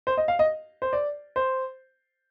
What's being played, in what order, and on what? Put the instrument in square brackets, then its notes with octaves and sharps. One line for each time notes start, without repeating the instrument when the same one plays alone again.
[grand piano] C5
D#5
F5
D#5
C5
D5
C5